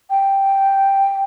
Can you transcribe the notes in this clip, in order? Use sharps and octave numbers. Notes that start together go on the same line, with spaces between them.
G5